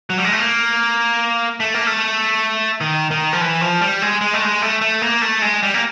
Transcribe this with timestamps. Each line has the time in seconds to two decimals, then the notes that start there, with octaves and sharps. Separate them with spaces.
0.10 F#3
0.18 G3
0.24 G#3
0.32 A3
0.39 A#3
1.60 A3
1.74 A#3
1.87 A3
2.81 D#3
3.11 D#3
3.33 F3
3.41 E3
3.61 F3
3.81 G3
4.02 G#3
4.21 G#3
4.34 A3
4.42 G#3
4.62 A3
4.81 A3
5.02 A#3
5.22 A3
5.42 G#3
5.63 G3
5.74 A#3